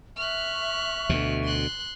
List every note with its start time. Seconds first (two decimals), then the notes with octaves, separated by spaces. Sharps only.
0.17 E5 C#6 F6 F#6
1.09 D2 B2
1.44 C6 F#6